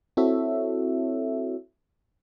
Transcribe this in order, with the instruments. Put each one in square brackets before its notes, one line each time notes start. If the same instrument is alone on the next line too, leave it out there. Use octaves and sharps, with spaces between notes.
[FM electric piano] C4 E4 F#4 A4 C#5 E5